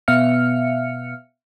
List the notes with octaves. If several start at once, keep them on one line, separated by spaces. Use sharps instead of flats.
B2 B3 E5 F5 F6 C#7